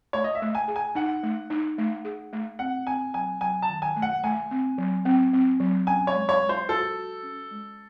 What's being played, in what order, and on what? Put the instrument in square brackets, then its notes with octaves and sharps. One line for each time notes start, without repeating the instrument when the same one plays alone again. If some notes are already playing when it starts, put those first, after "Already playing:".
[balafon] A3 [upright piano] C#5
[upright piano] D#5
E5
[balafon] A3
[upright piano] G#5
[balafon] G#4
[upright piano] G#5
[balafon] D#4 [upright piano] F#5
[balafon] A3
D#4
A3
G#4
A3
[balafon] C4 [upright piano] F#5
[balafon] C4 [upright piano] G#5
[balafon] F#3 [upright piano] G#5
[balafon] F#3 [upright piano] G#5
[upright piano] A5
[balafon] D#3
[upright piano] G#5
[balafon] A3
[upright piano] F#5
[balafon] A3 [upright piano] G#5
[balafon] C4
F#3
C4
C4
F#3
[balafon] C#4 [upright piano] G#5
[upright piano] C#5
[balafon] G#3
[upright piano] C#5
[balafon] G#3
[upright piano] C5
[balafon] F#4 [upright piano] A4
[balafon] F#4
C#4
G#3